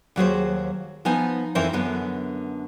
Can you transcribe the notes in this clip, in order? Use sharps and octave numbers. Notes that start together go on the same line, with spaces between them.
D#2 F#3 G#4 C5
F3 B3 D#4 G#5
F2 E3 C4 A#4 C5
F#2 D3 B3